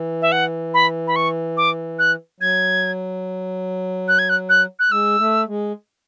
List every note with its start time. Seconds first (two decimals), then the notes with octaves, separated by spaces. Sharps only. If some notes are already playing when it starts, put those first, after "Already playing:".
Already playing: E3
0.22 E5
0.32 F#5
0.74 B5
1.07 B5
1.16 C#6
1.57 D6
1.99 F#6
2.40 F#3 G#6
4.08 F#6
4.19 G#6
4.29 F#6
4.49 F#6
4.79 F#6
4.91 G#3 E6
5.19 A3
5.47 G#3